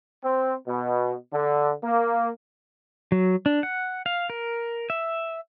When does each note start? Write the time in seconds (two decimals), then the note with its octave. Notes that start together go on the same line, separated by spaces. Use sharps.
0.24 C4
0.68 B2
1.33 D3
1.84 A#3
3.12 F#3
3.46 D4
3.63 F#5
4.06 F5
4.30 A#4
4.90 E5